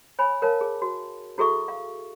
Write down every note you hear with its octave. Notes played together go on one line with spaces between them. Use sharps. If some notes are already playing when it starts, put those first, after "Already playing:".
C#5 G#5 B5
A#4 C#5 F5 A5
G#4
F#4
E4 F#4 G#4 A4 E5 C#6
F5